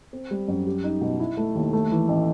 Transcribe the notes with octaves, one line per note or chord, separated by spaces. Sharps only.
C4
G3
F#2
G4
D#4
B2
E4
A3
D#2
A3
E3
A1